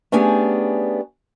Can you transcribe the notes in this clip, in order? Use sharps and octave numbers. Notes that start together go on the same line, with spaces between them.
A3 B3 C#4 D4 G4 G#4